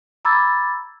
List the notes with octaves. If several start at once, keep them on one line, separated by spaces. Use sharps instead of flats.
A#5 B5 D6 E6 G#6 A6